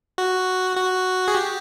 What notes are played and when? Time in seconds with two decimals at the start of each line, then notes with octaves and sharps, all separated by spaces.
0.18 F#4
0.77 F#4
1.28 G#4
1.35 G4